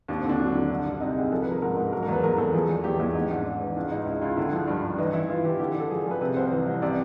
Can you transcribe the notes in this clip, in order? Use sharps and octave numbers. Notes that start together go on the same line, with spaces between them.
D#2 D4
C4
D3 D4
F#3
D3
C2
C2
C3 D#4
C2 G#4
F3 A4
B4
F3 A#4
G#2 A#4
G#2
F#3 A#4
A#4
E2 B4
E2 A#4
E2 A4
F3 G#4
E2
E2 G4
E2 E4
G#2 D#4
G#2 D4
G#2
E3
C#2 D4
C#2 D#4
C#2 E4
C#2 F4
D3 E4
F3
G2
G2
E3 D#4
E3 E4
E3 F4
E3 G4
D3 G4
D3
A4
F3 G#4
F3
B4
C3 B4
C2 C5
E3
C2
C3 D5